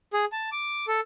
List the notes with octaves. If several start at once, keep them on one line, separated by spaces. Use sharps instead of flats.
G#4
A5
D6
A4